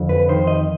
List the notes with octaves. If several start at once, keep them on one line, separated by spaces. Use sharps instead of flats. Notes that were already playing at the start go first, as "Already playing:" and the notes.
Already playing: F2 D3
B4
D#3 C5
D#5